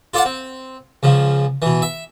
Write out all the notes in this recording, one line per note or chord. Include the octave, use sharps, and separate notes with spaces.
F4 A4 D5 F5 F#5
C4
C#2 C#3 F3
B2 E3
E5